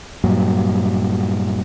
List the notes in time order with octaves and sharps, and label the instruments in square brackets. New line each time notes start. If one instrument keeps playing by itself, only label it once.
[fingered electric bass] G2 A#2 F#3